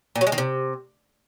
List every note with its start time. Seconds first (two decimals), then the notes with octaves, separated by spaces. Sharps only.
0.15 A#2
0.21 F#3
0.27 G#3
0.32 D#3
0.38 C3